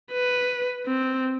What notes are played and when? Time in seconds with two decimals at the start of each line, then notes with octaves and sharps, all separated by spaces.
0.12 B4
0.86 C4